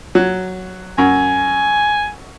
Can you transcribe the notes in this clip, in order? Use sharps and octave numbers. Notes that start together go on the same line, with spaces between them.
F#3
F#2 G#5